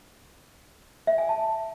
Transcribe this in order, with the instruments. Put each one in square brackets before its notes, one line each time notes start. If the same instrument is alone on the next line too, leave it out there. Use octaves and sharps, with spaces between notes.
[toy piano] E5
G#5
A5